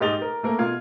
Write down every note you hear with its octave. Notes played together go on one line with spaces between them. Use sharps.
G#2 G4 D#5 A6 F7 G7
A#4
A3 A#3 A#4
B2 F4 F5 G#6